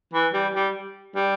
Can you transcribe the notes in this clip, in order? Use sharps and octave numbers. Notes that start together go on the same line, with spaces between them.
E3
G3
G3
G3